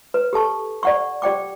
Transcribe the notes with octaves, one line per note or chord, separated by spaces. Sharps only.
B4
G4 A4 A5 C#6
D5 F#5 C#6
G4 D5 G5 D6